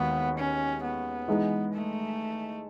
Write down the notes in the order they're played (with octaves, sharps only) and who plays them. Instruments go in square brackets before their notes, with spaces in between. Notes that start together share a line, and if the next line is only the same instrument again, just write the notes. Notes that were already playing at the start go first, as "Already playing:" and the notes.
Already playing: [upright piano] D#2 D#3 G#3 F#4 [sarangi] B3
[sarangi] C#4
B3
[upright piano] E3 G#3 D#4
[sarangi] A3